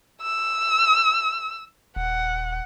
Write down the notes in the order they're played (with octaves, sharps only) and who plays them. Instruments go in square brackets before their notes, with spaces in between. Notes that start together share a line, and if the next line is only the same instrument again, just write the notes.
[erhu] E6
[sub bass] D#1 [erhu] F#5